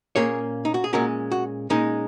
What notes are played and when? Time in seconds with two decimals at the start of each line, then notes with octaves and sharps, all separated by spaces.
0.16 A#2 A#3 C#4 G#4 C#5
0.65 D#4
0.74 F#4
0.84 G#4
0.93 A#2 G#3 C#4 F#4 A#4
1.32 F#4
1.70 A#2 G#3 C#4 D#4